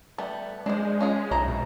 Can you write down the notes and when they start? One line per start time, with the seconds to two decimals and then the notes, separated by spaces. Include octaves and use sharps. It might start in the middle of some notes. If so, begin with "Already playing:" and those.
0.18 G3 A3 B3
0.66 G#3 D4 C5
1.01 C#4 F4 G#4
1.31 B1 E4 C5 A#5
1.48 B2